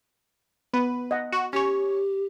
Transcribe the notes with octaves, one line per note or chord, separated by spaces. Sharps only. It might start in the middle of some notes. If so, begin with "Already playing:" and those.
B3 B4
D#5 F#5
F#4
C#4 G4 C#5